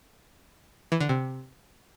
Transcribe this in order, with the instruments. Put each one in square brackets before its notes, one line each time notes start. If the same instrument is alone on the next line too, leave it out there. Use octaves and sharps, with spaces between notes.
[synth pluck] E3
D3
C3